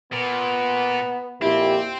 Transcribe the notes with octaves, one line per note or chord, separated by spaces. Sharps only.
A#2 B3
F2 A#2 C4 E4 G4